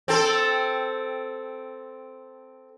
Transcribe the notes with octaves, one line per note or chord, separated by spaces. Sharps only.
C4 A4